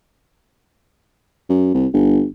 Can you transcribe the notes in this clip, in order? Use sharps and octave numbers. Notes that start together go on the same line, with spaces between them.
F#2
C2
G1